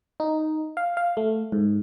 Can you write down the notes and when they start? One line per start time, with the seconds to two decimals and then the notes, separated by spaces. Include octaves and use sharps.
0.20 D#4
0.77 F5
0.97 F5
1.17 A3
1.52 G#2